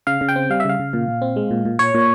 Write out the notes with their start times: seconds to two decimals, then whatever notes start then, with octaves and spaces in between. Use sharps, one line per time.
0.07 C#3 F5
0.21 C#3
0.29 G5
0.36 C4
0.50 G3 F5
0.60 E5
0.65 C#3 F5
0.80 C#3
0.93 A#2
1.08 A#2
1.22 C4
1.36 G#3
1.51 A#2
1.65 A#2
1.79 A#2 C#5
1.95 A#2